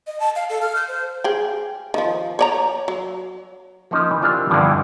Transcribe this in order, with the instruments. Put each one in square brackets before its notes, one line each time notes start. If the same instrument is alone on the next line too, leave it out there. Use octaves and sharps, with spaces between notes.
[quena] D#5
A5
F5
A4
F6
G6
C5
[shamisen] G#4 G5
D#3 F3
C#5 D5 A#5
F#3
[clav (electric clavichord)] F3 A#3 C#4 D#4
E3
C4 D4 E4 F4 G4 A#4
G2 B2 D3 E3 F3